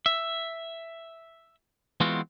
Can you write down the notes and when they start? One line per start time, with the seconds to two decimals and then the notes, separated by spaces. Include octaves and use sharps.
0.06 E5
2.00 E3 G#3 B3 C4 F4 F#4